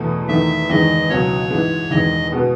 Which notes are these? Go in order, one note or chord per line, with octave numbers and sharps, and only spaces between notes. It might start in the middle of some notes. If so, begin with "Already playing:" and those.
Already playing: E2 B2 A3
E2 D#3 A3 E5
E2 D#3 G#3 D#5
C#2 B2 F#3 C#4 C#5
G#2 E3 G#3
E1 E2 D#3 G#3 D#5
B2 G#3 B3 F#4